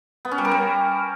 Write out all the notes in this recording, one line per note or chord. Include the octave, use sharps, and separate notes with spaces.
B3
C#4
G3
A#4
G3